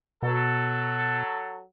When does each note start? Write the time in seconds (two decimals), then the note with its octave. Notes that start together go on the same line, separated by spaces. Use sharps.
0.23 B2 F#3 A4